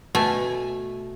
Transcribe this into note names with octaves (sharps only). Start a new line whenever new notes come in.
B2 A3 G#5